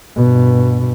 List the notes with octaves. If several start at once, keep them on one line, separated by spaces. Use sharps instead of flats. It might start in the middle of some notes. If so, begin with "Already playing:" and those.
G2 B2